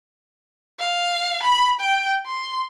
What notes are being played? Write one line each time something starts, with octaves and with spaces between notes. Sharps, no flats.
F5
B5
G5
C6